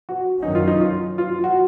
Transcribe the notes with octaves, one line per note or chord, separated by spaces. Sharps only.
F#4
F#2 D#3 F#3 C#4 D#4
F4
D#4
F4
F4
F4
F#4